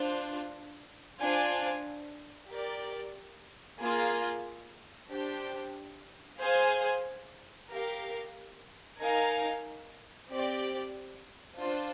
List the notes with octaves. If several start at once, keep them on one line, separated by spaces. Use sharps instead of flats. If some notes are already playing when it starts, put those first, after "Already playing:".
Already playing: D4 F4 C5
D4 F4 C5 F5 G#5
G4 A#4 D5
A#3 F4 G#4
D4 G4 C5
G#4 C5 F5 G#5
G4 A#4 F5
D#4 A#4 F5 G#5
C4 G4 D5
D4 F4 C5